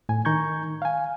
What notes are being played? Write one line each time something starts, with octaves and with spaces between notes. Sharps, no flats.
A2 G#5
D#3 A#5 C#6 G6 G#6
F5 G#5